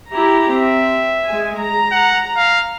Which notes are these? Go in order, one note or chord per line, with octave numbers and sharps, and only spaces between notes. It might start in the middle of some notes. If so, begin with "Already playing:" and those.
E4 G4 A#5
C4 E5
G#3 G#5
A#5
F#5
F5